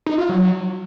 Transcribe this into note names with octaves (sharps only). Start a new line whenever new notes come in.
D#4
F4
F#3